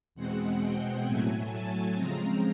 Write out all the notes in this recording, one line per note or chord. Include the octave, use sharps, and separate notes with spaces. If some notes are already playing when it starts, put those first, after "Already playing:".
E2 B2 G#3 C4 F#5
G5
A2 F#3 A3 G#5
A5
C#3 F3 G#3 C4 A#5